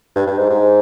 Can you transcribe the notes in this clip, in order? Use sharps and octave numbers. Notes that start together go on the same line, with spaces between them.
G2
G2
G#2
G#2